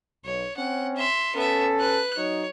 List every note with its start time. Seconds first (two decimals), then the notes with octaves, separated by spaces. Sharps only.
0.25 B1 C#5
0.57 C4 C#4 F#5
0.96 E5 C6
1.36 B3 C#4 A4 E5
1.79 B4 F#6
2.17 F#3 D#4 C#5